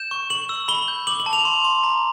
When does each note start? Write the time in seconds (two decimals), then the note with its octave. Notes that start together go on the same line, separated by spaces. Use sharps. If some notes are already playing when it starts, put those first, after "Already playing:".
Already playing: G6 E7
0.11 C#6
0.30 C#6 F#7
0.49 E6
0.68 B5 G7
0.88 G6
1.07 D6 F#7
1.20 F#7
1.26 A5
1.33 F7
1.45 C6
1.64 C6
1.84 A#5